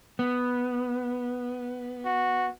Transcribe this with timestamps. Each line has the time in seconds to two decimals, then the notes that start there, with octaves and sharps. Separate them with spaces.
0.19 B3
2.05 F#4